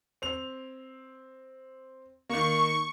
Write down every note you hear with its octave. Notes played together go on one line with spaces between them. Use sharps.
C4 F7
D#3 A#3 C#6